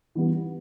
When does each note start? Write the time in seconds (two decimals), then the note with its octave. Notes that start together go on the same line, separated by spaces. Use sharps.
0.15 E3 G3 B3